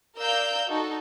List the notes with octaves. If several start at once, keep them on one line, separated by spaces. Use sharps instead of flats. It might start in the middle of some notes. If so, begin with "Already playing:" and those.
A#4 D5 F5 A#5 E6 G6
D#4 F#4 A4